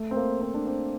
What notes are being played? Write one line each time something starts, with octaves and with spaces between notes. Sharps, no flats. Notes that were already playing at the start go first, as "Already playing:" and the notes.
Already playing: A3
C4
A#3
C4
D4
C4